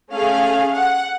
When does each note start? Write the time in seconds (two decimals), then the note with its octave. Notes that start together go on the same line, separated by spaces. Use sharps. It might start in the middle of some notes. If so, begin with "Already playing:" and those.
0.13 A3 C#4 G#4 F5
0.75 F#5